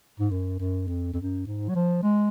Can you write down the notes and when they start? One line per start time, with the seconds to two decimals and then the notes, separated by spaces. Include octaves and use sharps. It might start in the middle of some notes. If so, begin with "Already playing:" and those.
0.20 G#2
0.31 F#2
0.59 F#2
0.88 F2
1.14 F2
1.17 F#2
1.46 G#2
1.69 F#3
1.75 F3
2.03 G#3